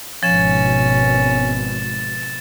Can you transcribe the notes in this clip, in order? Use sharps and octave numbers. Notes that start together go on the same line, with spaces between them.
G#1 B2 F3 C#4 A6 E7